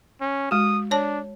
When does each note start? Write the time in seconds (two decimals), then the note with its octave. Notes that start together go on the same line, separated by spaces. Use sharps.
0.21 C#4
0.51 G#3 F#4 D#6
0.91 D4 C#5 A5